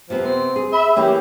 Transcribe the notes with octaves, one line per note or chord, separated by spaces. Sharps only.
C3 F3 B3
C4
G#4
E5 B5
E3 A#3 C#4 G4